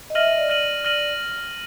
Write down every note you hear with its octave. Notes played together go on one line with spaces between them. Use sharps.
D#5
E5 F6 A#6 D#7 F#7
D#5
D5
F6 A#6 D#7 F#7
F6 A#6 D#7 F#7